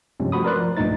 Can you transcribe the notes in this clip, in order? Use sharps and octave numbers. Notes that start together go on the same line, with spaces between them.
G2 C3 F3 G#3 C4 C#4
F3 A3 F#4 B5 D#6
A#4 B4 D5 C6 F#6
F3
B1 G2 A#2 A3 D#4 A6